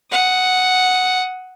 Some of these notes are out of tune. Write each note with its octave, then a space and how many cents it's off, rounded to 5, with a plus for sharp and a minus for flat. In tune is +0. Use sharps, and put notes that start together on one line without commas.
F#5 +0 D#6 +15